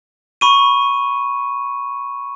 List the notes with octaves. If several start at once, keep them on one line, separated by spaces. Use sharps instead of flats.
B5 C#6 D#7